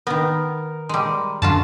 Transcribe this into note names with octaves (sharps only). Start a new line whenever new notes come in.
D#3 B3 A#4
G3 G#3
F#2 D3 F4 F#4 A5